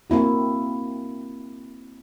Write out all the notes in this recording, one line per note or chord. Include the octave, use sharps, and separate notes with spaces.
A#3 C4 E4 F#4